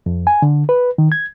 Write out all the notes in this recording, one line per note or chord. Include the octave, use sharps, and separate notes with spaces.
F2
G#5
D3
B4
D#3
G#6